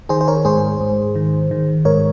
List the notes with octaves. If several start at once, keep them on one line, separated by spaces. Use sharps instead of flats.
D#3 G#4 C5
C5
A#4 C#5
G#2 G#4 C5
G#2
D#3
D#3
G#2 A#4 C#5